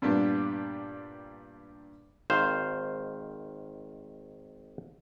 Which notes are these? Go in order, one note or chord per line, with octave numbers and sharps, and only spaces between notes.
G2 A#2 G3 B3 D4
G#1 D#3 C5 F5